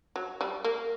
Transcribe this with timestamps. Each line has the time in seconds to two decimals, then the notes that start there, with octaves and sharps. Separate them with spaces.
0.16 F#3
0.41 G3
0.64 A#3